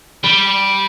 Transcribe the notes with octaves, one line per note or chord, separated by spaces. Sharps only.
G3